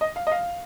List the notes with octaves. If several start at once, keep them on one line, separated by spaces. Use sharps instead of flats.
D#5
F5
D#5
F5